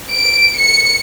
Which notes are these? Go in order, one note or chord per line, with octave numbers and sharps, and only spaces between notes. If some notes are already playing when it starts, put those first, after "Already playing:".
D7
C#7